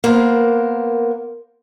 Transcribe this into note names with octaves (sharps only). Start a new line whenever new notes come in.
A#3 B3 A#4 C5